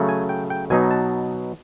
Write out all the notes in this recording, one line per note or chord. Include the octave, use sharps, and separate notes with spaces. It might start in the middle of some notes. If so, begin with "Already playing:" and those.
Already playing: C#3 F#3 A3
G#5
G5
G5
B2 F#3 B3 D#4 G#5
A5